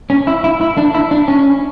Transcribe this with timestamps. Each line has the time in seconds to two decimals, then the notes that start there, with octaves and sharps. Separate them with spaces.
0.10 C#4
0.27 E4
0.44 E4
0.61 E4
0.77 D4
0.95 E4
1.11 D4
1.28 C#4